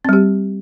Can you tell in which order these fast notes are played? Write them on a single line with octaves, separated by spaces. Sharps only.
C4 G3 G4